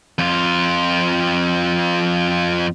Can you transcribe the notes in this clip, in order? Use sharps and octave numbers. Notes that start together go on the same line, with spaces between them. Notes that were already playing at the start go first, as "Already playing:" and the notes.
F2 F4